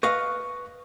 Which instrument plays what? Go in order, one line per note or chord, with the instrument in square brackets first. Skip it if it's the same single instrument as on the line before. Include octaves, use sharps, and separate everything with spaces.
[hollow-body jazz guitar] B4 D#5 F5 [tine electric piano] C#6